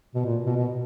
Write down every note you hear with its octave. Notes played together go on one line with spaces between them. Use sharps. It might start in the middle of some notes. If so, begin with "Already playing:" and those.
B2
A#2
B2
B2